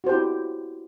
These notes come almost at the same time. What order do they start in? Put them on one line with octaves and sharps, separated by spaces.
F#4 C5 G4 E4